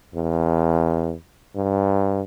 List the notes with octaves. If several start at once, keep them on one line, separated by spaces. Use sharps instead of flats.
E2
G2